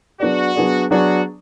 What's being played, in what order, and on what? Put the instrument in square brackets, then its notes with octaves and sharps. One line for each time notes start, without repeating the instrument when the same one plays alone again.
[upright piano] F#3 B3 D4 G#4 D5 [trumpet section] F#4
[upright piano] F#3 B3 D4 G#4 D5
[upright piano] F#3 B3 D4 G#4 D5 [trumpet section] F#4